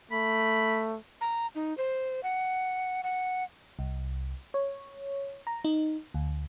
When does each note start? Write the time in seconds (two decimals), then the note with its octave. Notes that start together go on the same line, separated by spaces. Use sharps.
0.11 A3 B5
1.21 A#5
1.55 D#4
1.78 C5
2.23 F#5
3.03 F#5
3.79 C2
4.54 C#5
5.47 A#5
5.65 D#4
6.14 D2